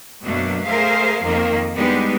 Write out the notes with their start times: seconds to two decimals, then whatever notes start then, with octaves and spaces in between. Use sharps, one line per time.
0.23 F#2 B2 F#3 A3 A#3 D4
0.65 A3 G#4 A#4 C5 E5 F5
1.23 F2 D#3 A#3 C4 A#4
1.76 G3 G#3 B3 D4 D#4 G4